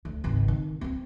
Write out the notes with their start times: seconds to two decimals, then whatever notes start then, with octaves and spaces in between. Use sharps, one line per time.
0.05 D2
0.24 G#1 C#2
0.48 D#3
0.81 A#3 C4